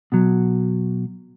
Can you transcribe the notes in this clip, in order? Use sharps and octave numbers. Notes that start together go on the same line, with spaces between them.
B2 F#3